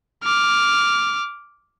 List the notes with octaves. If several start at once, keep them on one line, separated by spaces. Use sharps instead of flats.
D6 F6